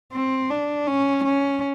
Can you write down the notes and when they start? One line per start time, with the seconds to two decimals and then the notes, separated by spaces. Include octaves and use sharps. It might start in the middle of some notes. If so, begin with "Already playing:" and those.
0.13 C4
0.50 D4
0.87 C#4
1.25 C#4